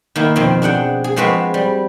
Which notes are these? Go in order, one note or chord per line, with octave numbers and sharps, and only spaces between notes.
D#3 A#3 E4
F2 B2 D#3 C4
D4 G#4 F#5 G5
G#4
F3 G#3 C4 F#4 B4
G3